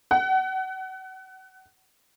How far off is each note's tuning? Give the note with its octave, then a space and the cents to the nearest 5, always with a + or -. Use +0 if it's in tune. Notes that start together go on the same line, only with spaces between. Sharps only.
F#5 +35